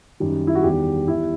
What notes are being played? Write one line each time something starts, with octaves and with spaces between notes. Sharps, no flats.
F#2 D#3 G3
E4
F#4
E2 D#3 G3 G4
E2 D#3 G3 E4